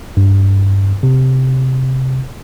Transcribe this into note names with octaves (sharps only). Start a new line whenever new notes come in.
G2
C3